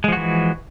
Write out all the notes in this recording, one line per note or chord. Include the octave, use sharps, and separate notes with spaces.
E3 F3 G#3 F#4